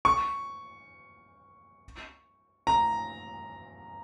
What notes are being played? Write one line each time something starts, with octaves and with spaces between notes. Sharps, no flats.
C#6
A#5